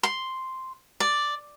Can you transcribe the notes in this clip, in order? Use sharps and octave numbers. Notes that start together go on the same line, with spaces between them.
C6
D5